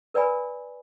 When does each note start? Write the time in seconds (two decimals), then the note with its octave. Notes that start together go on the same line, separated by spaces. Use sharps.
0.14 A#4 B4 D5 G5 G#5 B5